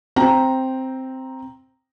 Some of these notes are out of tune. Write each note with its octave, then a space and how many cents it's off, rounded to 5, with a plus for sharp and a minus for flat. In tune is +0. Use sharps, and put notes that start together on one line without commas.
C4 +0 G5 +0 A#5 +0